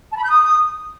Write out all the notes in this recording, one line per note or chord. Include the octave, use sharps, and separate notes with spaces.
A5
B5
G6
D#6